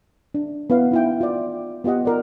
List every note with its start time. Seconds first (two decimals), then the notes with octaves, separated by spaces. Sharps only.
0.34 D4
0.70 B3 E4 B4 F5
0.91 D#4 E4 G5
1.21 F4 D5
1.84 B3 F4 G4 D#5 F#5
2.05 F4 A#4 D5